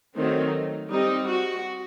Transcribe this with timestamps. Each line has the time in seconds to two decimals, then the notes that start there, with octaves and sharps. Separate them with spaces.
0.16 D#3 F#3 A3 C4 D#4
0.90 G3 C4 D#4
1.27 F#4